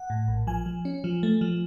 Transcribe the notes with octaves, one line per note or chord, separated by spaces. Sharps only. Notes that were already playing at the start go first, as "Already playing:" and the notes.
Already playing: F#5
A2
A#1
F3 G#5
F3
C#4
F3
A3
F3